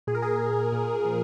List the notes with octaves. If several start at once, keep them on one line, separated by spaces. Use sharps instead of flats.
A#2 G#4
A#4
G#4
A#2
A#2
F3